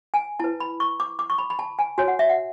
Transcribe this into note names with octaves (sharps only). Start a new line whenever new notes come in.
G#5
E4 B4 A5
B5
C#6
D6
D6
C#6
B5
B5
A5
G#5
F#4 C#5 G#5
F#5
E5
F#5